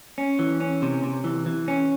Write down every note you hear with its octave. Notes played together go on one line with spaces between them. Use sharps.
C#4
E3
C#4
C3
C3
E3
E3
C#4